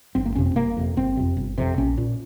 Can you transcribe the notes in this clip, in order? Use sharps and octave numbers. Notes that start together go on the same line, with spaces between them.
G1 C4
A#3
F2 C3 C#4
C4
G1 A#3
F2 C3
G1 C4
F2 C3
G1
F2 C3
A#1 C#4
A#2